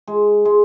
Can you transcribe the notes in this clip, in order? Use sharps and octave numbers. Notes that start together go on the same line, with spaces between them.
G#3
G#3